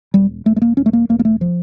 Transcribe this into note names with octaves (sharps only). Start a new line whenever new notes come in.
E1 G3
E1 A3
A3
A#3
E1 C#4
A3
A#3
E1 A#3
A#3
A3
F3